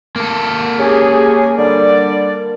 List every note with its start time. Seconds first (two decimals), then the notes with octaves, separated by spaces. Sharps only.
0.16 A#3 A4
0.78 C#4 G4 G#4
1.58 D3 G3 D5